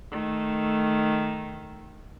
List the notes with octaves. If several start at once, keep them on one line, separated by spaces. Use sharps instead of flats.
D#3 A3